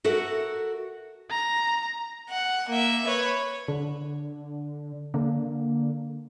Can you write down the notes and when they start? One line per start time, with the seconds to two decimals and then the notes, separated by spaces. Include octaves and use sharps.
0.04 F#4 A4 A#4 E5
1.30 A#5
2.29 F#5
2.69 A#3 E5
3.06 B4 C#5
3.68 D3
5.14 D3 A#3